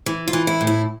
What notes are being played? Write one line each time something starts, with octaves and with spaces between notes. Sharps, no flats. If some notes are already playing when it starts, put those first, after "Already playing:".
E3
F4
E3
E4
A2
E4